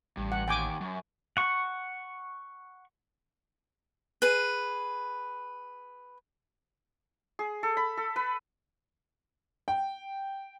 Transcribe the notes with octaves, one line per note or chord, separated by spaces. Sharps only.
A1 G2
F#5
D#2 G5 G#5 D6
F#2
F#5 C#6
G#4 B4
G#4
A4
B5
A4
B4
G5